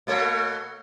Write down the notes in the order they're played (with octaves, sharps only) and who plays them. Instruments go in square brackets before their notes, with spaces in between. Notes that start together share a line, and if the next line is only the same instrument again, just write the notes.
[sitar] B2 A3 C#5